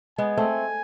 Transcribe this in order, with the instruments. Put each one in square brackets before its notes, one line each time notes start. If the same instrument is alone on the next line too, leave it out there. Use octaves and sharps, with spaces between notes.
[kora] G#3 B3 [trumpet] G#5
[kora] A3 C4